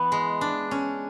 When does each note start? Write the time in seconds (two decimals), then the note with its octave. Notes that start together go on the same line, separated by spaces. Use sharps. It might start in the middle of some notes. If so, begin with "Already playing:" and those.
Already playing: E3 B3
0.12 G#3
0.41 D4
0.71 C#4